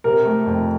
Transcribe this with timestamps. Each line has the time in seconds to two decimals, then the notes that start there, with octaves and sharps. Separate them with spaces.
0.04 C3 A#4
0.25 A3
0.46 F2